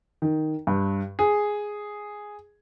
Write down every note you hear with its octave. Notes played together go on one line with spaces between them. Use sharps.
D#3
G2
G#4